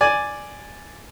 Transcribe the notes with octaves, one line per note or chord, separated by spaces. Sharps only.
D5 G#5